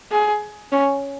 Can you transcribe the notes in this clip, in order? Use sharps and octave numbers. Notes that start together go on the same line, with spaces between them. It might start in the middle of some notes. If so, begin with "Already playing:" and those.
G#4
C#4